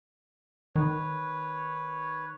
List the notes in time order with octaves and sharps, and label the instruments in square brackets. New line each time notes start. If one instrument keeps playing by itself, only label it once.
[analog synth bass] D#3 [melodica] B4 C#5